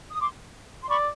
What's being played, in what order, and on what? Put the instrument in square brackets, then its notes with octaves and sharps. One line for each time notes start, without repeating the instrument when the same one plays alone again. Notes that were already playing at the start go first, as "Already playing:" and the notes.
[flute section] D#6
C6 D6
C6
[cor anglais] D5 [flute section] B5 C#6